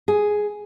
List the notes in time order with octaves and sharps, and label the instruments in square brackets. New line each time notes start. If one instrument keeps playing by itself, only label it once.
[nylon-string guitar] G#4